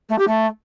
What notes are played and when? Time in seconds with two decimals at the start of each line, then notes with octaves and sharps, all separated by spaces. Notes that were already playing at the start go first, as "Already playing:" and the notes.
0.09 A3
0.18 G4
0.28 A3